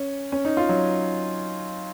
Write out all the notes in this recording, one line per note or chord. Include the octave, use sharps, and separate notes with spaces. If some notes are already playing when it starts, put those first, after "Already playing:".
Already playing: C#4
C#4
D#4
F4
F#3